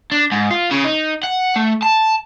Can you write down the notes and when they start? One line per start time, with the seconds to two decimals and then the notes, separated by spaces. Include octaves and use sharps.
0.12 D4
0.32 G#2
0.51 F4
0.71 C#3
0.85 D#4
1.23 F#5
1.56 A3
1.82 A5